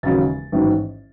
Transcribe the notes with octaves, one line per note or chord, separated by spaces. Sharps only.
E1 D#2 C#3 F#3 A6
A1 G#2 D#3 F#3